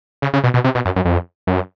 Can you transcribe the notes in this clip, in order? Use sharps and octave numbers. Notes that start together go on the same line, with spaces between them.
C#3
C#3
B2
B2
C3
B2
F#2
F#2
F2
F#2